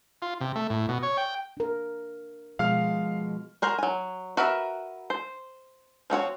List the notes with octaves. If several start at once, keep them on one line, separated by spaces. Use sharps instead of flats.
F4
C3
A3
A2
B2
C#5
G5
D4 A#4
B2 F3 G#3 F5 F6
F#4 A#4 C5
F#3 G#5
F#4 A#4 B4 D#5 E5
C5
F3 C4 F#4 C#5